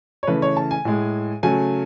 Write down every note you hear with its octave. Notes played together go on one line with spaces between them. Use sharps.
C#5
C#3 E3 A3 B4
C#5
A5
G#5
A2 G#3
C#3 F#3 A3 G#5